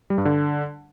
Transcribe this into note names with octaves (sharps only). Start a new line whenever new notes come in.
G3
G2
D3